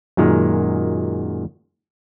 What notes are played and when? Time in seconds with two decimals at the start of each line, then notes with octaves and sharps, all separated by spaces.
0.17 F#2 A#2 D#3 G#3